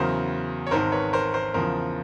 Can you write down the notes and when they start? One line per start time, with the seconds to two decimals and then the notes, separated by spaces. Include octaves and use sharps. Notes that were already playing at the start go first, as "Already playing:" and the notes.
Already playing: E2 C#3 F#3 A#4 C5
0.67 C#5
0.71 G#1 G#2 D#3 A#4 C5
0.92 B4 C#5
1.13 A#4 C5
1.33 A#4 C5
1.54 E2 C#3 F3 A#4 C5